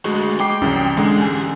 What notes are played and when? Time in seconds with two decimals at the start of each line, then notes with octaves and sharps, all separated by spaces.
0.05 G#3 A3 F#4
0.40 G#3 G5 D6 C7
0.62 C2 F#2 E3 C#4
0.97 G#2 D3 G#3 G#4
1.20 G4 G#5